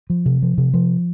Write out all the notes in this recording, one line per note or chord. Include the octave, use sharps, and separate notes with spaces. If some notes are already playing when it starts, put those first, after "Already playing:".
F3
C3
F3
C3
F3